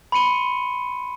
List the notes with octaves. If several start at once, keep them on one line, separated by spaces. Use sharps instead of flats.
B5 C6 C#7 D#7 G7